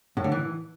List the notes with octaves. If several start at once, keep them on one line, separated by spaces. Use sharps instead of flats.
A2
D3
E3